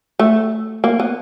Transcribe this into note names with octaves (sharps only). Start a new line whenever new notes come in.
A3
A#3
B3